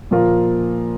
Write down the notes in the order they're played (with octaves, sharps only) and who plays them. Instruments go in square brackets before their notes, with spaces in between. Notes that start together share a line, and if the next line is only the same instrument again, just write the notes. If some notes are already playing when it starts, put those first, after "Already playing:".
[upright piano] A#2 F3 A#3 F4 A#4